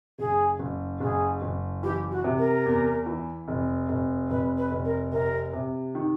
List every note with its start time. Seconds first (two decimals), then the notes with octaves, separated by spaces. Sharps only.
0.19 F#1 G#4
0.59 F#1
1.00 F#1 G#4
1.42 F#1
1.83 E3 G4
2.11 F#4
2.24 C3
2.38 A#4
2.66 E2
3.06 E3
3.48 F1
3.89 F1
4.30 F1 B4
4.57 B4
4.71 F1
4.85 A#4
5.12 C3 A#4
5.53 C3
5.95 D#3